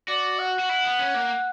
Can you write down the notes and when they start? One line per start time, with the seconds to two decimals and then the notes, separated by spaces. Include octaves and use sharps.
0.08 F#4 D5
0.39 F#5
0.59 F#4
0.69 E4
0.84 B3
0.99 C#4
1.14 A#3